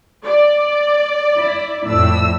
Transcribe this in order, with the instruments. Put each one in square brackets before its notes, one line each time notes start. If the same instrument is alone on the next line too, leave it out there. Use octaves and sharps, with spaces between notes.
[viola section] D5
[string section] E4
F2 A2 E6